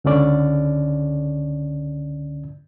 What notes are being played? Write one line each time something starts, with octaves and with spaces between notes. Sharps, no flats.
C#2 D3 C#4 D5